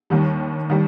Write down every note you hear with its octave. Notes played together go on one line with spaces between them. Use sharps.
D#2 D#3 G3
D#3 G3